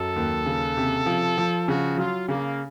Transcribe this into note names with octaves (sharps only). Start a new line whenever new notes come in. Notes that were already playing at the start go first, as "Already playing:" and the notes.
Already playing: F#2 F#3 A4
D#2
C#3
C3
F3
F3
C#3 F#4
F#3 F4
C#3 A#3